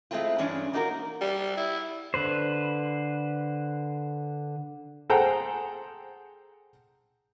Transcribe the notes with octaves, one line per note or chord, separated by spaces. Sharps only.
G#3 A3 C4 E4 F4
G2 E3 G#3 C#4 D4
A#3 D#4 F4 F#4 A#4
G3
E4
D3 B4 C5
G#4 A4 C5 F#5 G5 A#5